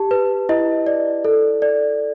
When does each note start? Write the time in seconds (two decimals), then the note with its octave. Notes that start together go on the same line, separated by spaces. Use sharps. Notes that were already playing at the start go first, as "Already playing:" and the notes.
Already playing: G4 A5
0.11 B4
0.49 E4 D#5
0.87 D5
1.25 A4
1.62 D5